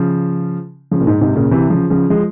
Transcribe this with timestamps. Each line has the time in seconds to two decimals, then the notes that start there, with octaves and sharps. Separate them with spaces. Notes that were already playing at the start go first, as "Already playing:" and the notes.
Already playing: C#3 F3
0.91 C#3 F3
1.01 A#2
1.07 G#2
1.21 G#2 C3
1.35 A#2 C#3
1.51 C3 E3
1.70 C#3 F3
1.90 C#3 F3
2.10 F3 G#3